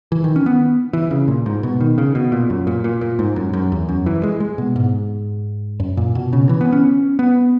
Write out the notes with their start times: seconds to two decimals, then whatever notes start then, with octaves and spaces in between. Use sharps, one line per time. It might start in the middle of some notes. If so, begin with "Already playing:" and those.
0.12 E3
0.24 D#3
0.36 C#4
0.46 B3
0.93 E3
1.11 C#3
1.28 A#2
1.46 G#2
1.63 B2
1.81 D#3
1.98 C#3
2.15 B2
2.32 A#2
2.50 F#2
2.67 A#2
2.84 A#2
3.01 A#2
3.19 G#2
3.36 F#2
3.53 F#2
3.72 E2
3.89 F#2
4.06 E3
4.23 G#3
4.40 G#3
4.58 B2
4.76 G#2
5.80 F#2
5.97 A#2
6.15 B2
6.33 C#3
6.49 E3
6.61 B3
6.72 C#4
7.19 B3